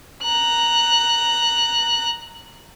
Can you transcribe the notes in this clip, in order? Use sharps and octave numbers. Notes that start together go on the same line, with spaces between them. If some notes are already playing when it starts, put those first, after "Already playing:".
A#5 F#6